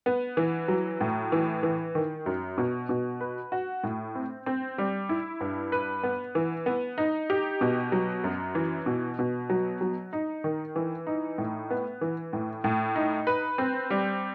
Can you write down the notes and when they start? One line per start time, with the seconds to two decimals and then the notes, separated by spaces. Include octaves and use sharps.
0.06 B3
0.37 E3
0.68 F#3
1.01 A2
1.32 E3
1.63 E3
1.95 D#3
2.26 F#2
2.58 B2
2.89 B2
3.21 B4
3.52 F#4
3.84 A2
4.15 C4
4.46 C4
4.78 G3
5.09 E4
5.41 G2
5.72 B4
6.03 B3
6.35 E3
6.66 B3
6.98 D#4
7.30 G4
7.61 B2
7.92 F#3
8.24 F#2
8.55 E3
8.86 B2
9.19 B2
9.50 F#3
9.81 F#3
10.13 D#4
10.44 D#3
10.76 E3
11.07 D#4
11.38 A2
11.71 B3
12.01 E3
12.33 A2
12.64 A2
12.96 D#4
13.27 B4
13.58 C4
13.90 G3